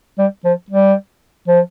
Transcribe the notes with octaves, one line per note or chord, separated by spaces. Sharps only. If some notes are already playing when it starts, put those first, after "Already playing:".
G3
F3
G3
F3